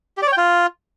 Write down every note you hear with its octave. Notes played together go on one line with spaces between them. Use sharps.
G4
D5
C#5
G5
F4